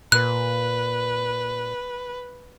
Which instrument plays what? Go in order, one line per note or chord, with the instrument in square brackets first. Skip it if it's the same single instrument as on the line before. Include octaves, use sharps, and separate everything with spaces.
[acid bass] A#2 [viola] B4 [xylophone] F#6